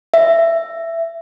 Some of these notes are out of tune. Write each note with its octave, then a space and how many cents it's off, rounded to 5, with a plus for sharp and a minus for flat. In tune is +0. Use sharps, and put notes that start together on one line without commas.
E5 +15